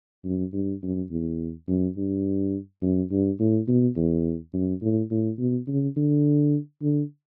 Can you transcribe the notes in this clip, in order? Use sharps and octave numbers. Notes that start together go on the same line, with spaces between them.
F#2
G2
F#2
E2
F#2
G2
F#2
G2
A2
B2
E2
F#2
A2
A2
B2
C#3
D3
D3